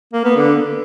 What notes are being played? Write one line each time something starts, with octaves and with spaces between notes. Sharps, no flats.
A#3
B3
D3